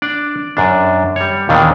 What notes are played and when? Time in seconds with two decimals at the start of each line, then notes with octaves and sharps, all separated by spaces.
0.02 D4 D5
0.57 F#2 D4
1.16 G3 C#5
1.49 D#2 A#2 D#3 E3 B3 D4